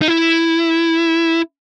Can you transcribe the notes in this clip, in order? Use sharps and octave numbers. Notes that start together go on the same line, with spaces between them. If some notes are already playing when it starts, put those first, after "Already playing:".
D#4
E4